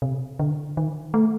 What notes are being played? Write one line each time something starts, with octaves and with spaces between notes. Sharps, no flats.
C3
D3
D#3
A3